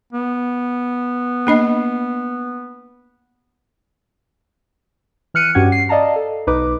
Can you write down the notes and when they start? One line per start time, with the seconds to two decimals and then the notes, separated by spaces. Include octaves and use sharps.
0.13 B3
1.47 A#3 D4 D#5
5.34 E3 F6 F#6 C#7 D#7
5.55 G2 C#4 F#4 G4 F#5 G#6
5.72 C7
5.89 D5 D#5 F5 A5 A#5
6.16 A4
6.47 B1 D#4 B4 D6